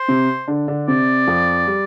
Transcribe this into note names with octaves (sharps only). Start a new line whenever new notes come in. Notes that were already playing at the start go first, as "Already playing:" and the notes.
Already playing: C5
C3 C4
D3 D4
D3 D4
C3 C4 D5
F2 F3
G3